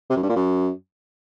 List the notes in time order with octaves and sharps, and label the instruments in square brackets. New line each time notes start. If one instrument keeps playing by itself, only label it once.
[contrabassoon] C3
F#2
G2
A#2
F#2